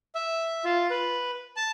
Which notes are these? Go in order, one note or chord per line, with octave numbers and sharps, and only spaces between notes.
E5
F4
B4
A5